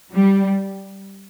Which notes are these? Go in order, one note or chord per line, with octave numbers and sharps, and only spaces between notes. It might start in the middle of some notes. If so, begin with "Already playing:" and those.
G3